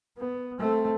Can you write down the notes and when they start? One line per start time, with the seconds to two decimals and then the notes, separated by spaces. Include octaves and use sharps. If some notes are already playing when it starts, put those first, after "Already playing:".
0.18 B3
0.59 A3 C4